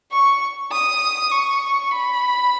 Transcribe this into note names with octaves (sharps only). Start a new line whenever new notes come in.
C#6
D#6
C#6
B5